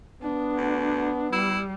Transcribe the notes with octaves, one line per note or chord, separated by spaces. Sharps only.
B3 D4
D2
G3 E4